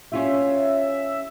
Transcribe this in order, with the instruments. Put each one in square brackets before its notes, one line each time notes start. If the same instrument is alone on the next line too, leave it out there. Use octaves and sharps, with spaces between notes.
[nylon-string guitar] C#4 F4 G4 [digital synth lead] E5